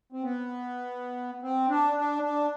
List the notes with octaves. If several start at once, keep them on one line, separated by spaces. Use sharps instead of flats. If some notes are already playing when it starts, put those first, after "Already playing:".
C4
B3
C4
D4
D4
D4